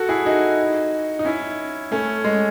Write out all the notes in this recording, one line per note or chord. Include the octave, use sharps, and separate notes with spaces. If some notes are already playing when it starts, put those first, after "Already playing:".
Already playing: F#4 A4
E4 G#4
D#4 F#4
D#4
C#4 E4
A3 C#4
G#3